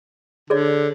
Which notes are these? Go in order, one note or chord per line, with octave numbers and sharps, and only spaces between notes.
D3 G#4 C#5 D5